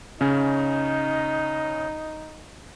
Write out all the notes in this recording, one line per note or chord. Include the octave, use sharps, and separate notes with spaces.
C#3 C#4 D#4